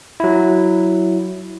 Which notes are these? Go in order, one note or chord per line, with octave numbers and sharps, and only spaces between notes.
F#3 E4